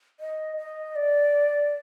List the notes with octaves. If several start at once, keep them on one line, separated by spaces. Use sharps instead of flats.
D#5
D#5
D5